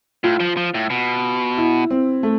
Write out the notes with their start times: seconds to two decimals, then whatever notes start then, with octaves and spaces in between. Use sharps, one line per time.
0.24 A2 F4
0.40 F3
0.57 F3
0.74 A2
0.90 B2
1.57 E4
1.91 C4
2.23 A3